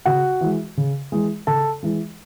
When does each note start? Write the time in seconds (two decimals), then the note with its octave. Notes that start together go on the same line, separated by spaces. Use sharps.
0.05 C#3 F#4 F#5
0.41 E3 G#3
0.77 C#3
1.12 E3 G#3
1.47 C#3 A4 A5
1.83 E3 G#3